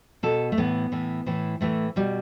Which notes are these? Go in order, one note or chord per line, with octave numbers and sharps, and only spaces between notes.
B2 A4
A3
A2 E3 B3
A2 E3
A2 E3
A2 E3 A3
B2 G3